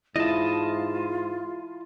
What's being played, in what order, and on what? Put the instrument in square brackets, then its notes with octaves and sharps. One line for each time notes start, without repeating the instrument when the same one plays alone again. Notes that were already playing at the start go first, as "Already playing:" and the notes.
[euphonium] G#2 [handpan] E4 [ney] F4 [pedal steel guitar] D#5 A5